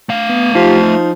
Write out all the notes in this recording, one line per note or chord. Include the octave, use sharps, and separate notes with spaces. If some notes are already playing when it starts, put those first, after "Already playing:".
A3 F5
B3
F3 D#4 F4 G4
D#4